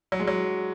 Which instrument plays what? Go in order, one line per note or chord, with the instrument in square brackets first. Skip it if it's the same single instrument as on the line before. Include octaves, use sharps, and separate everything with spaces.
[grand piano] F#3
G#3
F#3